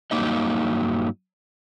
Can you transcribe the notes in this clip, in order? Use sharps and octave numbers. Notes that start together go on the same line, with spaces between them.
G2 D#3 F#3 A#3 D#4 D#5